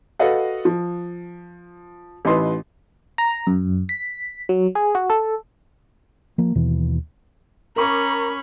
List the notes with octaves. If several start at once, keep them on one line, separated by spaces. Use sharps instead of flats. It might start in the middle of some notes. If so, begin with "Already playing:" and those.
F#4 A4 B4 D#5 F5 F#5
F3
A1 E3 D#4 B4 C6
A#5
F#2
B6
F#3
G#4
F#4
A4
F3 A#3
D#2 B2 E3
C#4 A#4 A#5 B5 C#6 D6